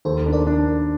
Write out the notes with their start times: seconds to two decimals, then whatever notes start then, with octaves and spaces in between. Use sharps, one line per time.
0.05 D#2 A4 C5
0.26 D4
0.33 A#4 D5
0.47 D4